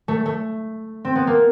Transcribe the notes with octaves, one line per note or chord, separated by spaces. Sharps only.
A3
A3
C4
B3
A#3